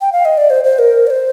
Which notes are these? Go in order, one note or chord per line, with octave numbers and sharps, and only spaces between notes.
G5
F5
D#5
D5
C5
C5
A#4
D5
C5